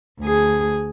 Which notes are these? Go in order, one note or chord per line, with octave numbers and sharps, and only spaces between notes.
D2 G#4